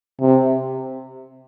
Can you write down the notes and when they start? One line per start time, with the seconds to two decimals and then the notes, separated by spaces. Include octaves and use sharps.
0.21 C3